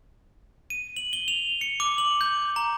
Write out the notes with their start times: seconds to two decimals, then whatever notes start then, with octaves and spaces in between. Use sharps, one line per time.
0.70 D#7
0.96 F#7
1.13 G7
1.28 F7
1.61 C#7
1.80 D6
1.98 F#7
2.21 G6
2.56 A#5